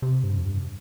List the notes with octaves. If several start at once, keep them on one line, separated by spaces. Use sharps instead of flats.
C3
G2
F2
G2